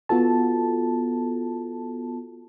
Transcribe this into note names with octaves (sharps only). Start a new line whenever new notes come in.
B3 F4 F#4 A4 A5